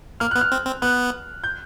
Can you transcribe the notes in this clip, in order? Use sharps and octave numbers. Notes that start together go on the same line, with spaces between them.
A#3 F6
B3 F#6
F6
C4
C4
B3 F#6
G6